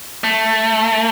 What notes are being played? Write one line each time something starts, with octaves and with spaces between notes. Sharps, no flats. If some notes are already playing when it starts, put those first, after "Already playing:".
A3